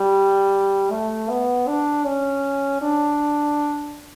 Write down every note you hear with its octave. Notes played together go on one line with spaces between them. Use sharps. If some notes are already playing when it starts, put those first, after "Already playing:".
Already playing: G3
A3
B3
D4
C#4
D4